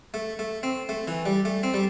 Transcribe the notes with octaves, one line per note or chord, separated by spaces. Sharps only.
A3
A3
C4
A3
E3
G3
A3
C4
G3